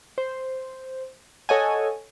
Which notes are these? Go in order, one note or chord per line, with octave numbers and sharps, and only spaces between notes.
C5
A4 C#5 D#5 F#5 G#5